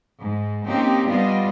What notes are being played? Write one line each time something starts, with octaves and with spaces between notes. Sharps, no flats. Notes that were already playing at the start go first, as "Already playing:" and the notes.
G#2
A#3 C4 C#4 D#4 G4
G3 B3 D4 F4 D#5